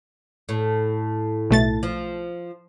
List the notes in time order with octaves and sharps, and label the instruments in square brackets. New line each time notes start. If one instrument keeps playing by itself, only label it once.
[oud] A2
[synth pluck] B1 A3 A6
[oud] F3